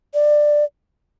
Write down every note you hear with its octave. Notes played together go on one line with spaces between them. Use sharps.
D5